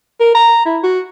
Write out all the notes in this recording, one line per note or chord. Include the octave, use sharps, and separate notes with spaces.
A#4
A#5
E4
F#4